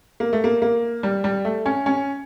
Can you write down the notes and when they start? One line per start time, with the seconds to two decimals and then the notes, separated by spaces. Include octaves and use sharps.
0.20 A#3
0.33 A3
0.44 A#3
0.62 A#3
1.03 G3
1.24 G3
1.45 A3
1.66 C#4
1.86 C#4